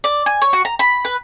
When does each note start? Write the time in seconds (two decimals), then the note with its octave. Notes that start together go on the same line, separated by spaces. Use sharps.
0.04 D5
0.26 G#5
0.42 C#5
0.53 F#4
0.65 A#5
0.79 B5
1.05 B4